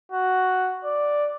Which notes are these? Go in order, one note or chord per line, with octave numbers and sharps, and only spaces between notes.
F#4
D5